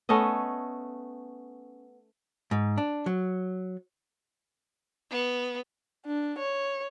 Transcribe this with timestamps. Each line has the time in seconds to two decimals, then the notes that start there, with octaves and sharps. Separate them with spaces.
0.09 A3 B3 C#4 D#5
2.51 G#2
2.78 D4
3.06 F#3
5.11 B3
6.07 D4
6.39 C#5